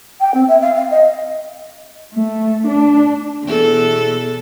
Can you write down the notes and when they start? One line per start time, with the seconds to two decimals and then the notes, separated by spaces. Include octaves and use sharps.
0.21 G5
0.34 C4
0.48 E5
0.61 F5
0.74 F5
0.91 D#5
2.13 A3
2.65 D4
3.43 E2 B2 A4